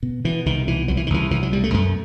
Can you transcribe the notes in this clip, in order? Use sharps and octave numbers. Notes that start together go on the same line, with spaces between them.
B2
B2 E3
C2 D#3
B2 E3
C2 F#3
E3
D#3
C2 E3
C2 E3
F#3
B2 G3
A3
F#2 A3